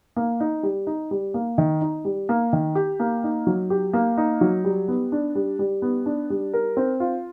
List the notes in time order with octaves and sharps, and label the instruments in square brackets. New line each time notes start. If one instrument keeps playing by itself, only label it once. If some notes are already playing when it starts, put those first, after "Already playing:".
[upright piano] A#3
D#4
G3
D#4
G3
A#3
D#3
D#4
G3
A#3
D#3
G4
A#3
D#4
F#3
G4
A#3
D#4
F#3
G3
B3
D4
G3
G3
B3
D4
G3
A#4
C4
F4